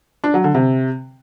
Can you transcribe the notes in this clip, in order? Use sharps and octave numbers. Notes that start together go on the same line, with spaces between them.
D4
F#3
D3
C3